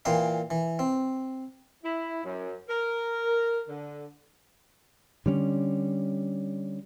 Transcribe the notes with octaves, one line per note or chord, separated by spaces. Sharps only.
A#2 E3 A#3 G5 C6
E3
C4
E4
F#2
A#4
D3
D3 G3 C#4